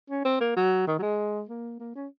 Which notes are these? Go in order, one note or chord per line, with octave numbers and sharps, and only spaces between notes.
C#4
C4
A#3
F#3
D#3
F#3
G#3
A#3
A#3
C#4